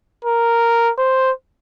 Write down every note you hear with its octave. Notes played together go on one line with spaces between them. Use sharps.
A#4
C5